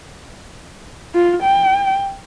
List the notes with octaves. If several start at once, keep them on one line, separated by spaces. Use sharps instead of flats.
F4
G5